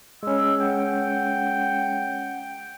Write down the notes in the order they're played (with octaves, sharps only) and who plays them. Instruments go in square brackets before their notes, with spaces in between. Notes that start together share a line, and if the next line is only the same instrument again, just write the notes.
[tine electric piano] G#3 C#4 [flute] E6
[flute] F#5 [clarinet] G5